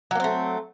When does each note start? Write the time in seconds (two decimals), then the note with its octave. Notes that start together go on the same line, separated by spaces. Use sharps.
0.11 F#3
0.15 A#3
0.20 C4
0.24 A3